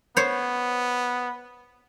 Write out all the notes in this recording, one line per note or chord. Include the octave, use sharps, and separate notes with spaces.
B3 C5 C#5